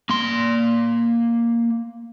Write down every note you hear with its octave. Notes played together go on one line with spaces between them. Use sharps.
A#3 C6